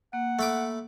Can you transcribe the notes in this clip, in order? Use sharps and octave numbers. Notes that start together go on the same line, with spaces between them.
A#3 F#5
A3 B5 D6